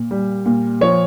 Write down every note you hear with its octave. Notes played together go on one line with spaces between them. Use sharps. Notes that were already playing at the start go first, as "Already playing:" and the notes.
Already playing: A#2
G3
A#2
F3 C#5